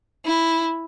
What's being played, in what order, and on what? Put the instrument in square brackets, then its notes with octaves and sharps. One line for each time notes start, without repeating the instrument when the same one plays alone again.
[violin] E4